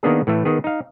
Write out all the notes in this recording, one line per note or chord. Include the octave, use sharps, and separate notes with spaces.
D#3 A#3 B3 D4 G#4
A2 E3 A3
D#3 B3 G#4
D#4 F5